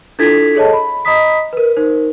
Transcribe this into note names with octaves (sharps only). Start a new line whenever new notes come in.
D4 E4 F4 A4 G#6 B6
G#4 A4 C#5 D#5 A5
B5
D#5 A#5 B5 D#6 B6
A#4 B4
D#4 A#4 C5